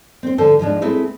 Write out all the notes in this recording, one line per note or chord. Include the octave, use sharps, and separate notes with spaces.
C4 C5
D3 F3 A4 C5 A5
G#2 F3 G#3 D4
A3 C4 E4 G#4 B4